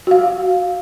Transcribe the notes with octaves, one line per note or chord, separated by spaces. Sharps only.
F#4 F5